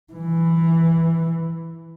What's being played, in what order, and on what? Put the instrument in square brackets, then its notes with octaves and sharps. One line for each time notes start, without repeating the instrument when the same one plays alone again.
[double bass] E3